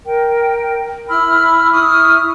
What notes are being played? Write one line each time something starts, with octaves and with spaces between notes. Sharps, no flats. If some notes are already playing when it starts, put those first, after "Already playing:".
A#4 G5
E4 B5 E6 F6
E4 C#6 D#6 F6